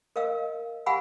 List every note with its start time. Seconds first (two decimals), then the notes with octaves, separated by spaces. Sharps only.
0.16 A#4 D#5 F5 E6
0.86 G4 F5 F#5 G#5 B5 E6